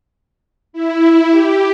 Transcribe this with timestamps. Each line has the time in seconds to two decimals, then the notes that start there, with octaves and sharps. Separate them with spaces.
0.73 E4
1.30 G4